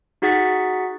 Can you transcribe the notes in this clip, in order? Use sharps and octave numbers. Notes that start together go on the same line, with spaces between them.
D#4 F#4 G#4 F#5 A6 B6